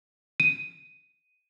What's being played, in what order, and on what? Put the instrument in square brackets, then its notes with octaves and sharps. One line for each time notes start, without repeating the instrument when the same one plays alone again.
[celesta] D#7